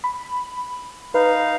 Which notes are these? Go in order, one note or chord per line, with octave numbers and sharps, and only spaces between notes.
B5
D#4 B4 F5